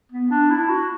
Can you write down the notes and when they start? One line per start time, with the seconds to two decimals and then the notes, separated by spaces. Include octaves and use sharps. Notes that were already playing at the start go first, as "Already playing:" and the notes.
0.12 B3
0.31 D4
0.50 E4
0.69 F#4